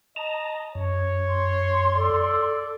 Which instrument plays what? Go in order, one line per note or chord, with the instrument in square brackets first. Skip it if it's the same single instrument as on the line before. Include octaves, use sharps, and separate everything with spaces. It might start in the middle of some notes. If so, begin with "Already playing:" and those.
[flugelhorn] D#5 [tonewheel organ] A5 A#5
[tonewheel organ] F#2 [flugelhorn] C#5
[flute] C6
[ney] A4 [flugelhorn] D5